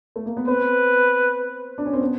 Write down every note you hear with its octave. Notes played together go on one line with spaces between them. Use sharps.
A3
A#3
B3
C4 B4
D4
C#4
C4
B3